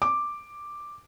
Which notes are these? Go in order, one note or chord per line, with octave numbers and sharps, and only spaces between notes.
D6